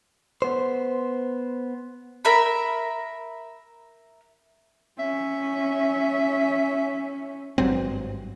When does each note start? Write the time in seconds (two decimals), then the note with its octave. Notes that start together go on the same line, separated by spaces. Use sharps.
0.42 B3 C5
2.25 A#4 E5 B5
4.99 C#4 E5
7.58 G#1 G2 F#3 C4